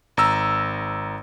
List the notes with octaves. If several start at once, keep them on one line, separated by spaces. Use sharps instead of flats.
G#1 A#5 E6